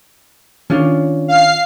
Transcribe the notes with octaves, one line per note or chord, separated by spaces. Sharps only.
D#3 C#4 D4 F4
F5 C7